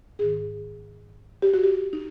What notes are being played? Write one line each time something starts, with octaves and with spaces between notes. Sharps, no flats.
G#2 D#3 G#4
G4
F#4
G4
D#4